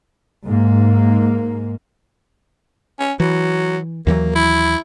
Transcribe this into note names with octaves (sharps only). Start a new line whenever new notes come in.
G#2 A#3
C#4
E3 F#3
D#2 E3 F#3 A#3
E4